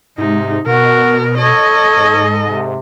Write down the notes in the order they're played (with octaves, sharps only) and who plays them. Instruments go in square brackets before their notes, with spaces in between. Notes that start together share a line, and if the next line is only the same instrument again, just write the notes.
[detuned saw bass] G#2 [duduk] C3 [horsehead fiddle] D#4
[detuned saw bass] B2 [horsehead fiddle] B3 A#4 [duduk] F#4
[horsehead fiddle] A4 D#5 [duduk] C#5
[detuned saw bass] G#2
[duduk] C3